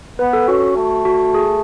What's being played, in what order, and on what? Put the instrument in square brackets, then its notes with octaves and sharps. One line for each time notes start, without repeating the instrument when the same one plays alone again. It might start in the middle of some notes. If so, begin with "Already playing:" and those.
[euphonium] B3 [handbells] B4
[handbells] A4
[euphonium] C#4 [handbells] F#4
[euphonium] A3
[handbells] F#4
G#4